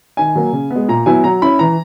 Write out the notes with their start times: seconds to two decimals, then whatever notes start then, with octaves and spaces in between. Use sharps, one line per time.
0.17 D#3 G#5
0.35 F#3 A#3
0.53 C#3
0.70 G#3 B3
0.88 A#2 A#5
1.06 F#3 B3 E4 G#5
1.24 F#3 A#5
1.42 C#4 E4 B5
1.59 E3 A#5